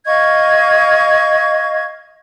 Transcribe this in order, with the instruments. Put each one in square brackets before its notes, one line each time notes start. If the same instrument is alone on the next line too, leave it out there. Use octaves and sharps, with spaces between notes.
[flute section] D#5 F5 C#6 G#6